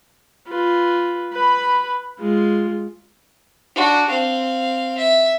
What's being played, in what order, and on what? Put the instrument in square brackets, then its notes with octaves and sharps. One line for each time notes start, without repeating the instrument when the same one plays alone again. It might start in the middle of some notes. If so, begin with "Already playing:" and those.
[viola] F4 B4
B4 B5
G#3 F4
[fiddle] D4 F#4
C4 F5
E5